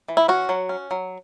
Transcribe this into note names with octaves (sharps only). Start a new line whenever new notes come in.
E3
E4
C#4 F#4
F#3
C#4
F#3